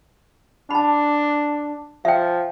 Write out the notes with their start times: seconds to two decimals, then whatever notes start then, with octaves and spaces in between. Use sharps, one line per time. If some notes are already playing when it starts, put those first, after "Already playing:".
0.70 D4 A5 B5
2.05 F3 E5 G5